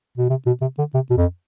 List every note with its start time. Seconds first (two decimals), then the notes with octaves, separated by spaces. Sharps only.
0.18 B2
0.30 C3
0.46 B2
0.61 C3
0.78 D3
0.94 C3
1.10 B2
1.17 F2